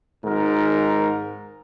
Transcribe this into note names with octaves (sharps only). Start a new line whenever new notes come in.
G#1 G#2 A#4